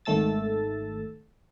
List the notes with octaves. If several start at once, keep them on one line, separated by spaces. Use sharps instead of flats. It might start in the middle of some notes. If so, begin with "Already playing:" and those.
G#1 D#3 A3 A4 E6 A6